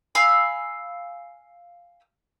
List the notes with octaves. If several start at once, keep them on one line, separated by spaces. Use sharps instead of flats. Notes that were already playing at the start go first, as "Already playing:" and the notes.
F5 G#5 B5 E6